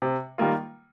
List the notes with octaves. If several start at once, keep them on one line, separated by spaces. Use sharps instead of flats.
C3
D#3 G3 A#3 F4